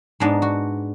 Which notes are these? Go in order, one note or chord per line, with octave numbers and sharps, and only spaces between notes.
G#2 G#3 B3 D4
F#4